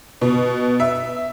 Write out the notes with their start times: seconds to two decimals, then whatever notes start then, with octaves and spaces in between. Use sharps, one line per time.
0.21 B2
0.80 E5